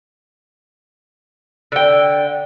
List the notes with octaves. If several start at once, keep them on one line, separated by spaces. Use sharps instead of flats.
D3 G5